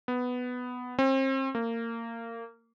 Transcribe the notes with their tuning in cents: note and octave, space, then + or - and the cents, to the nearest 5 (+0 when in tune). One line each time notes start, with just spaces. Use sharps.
B3 +5
C4 +35
A#3 -25